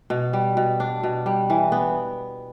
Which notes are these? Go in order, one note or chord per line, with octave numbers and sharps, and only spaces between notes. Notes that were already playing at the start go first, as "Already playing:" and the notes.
B2
G3
B2
D4
B2
G3
E3
B3